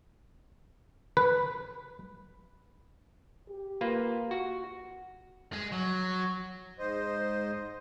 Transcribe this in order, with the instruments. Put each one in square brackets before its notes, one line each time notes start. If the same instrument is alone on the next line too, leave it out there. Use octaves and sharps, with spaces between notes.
[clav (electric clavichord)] B4
[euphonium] G4
[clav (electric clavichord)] A#3 F4 B4
F#4
[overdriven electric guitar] G#3 G#4
F#3
[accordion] G#2 C5 D#5